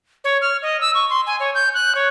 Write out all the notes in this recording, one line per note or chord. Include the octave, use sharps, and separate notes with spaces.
C#5
F6
D#5
E6
C#6
C6
G#5
C#5
G6
F#6
C#5